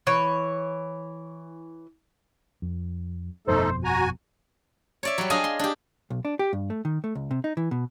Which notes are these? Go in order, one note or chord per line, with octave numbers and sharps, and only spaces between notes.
E3 C#5
F2
G1 F2 B2 A3 D#4 A4 C5
F#4 G#5 A#5
C#5 D5 E5
F#3 G3
D4 G#4 D#5 F5 G#5
C6
D4 G4
B1
D4
G4
G2
A3
D#3
A3
C#2
C3
D#4
E3
B2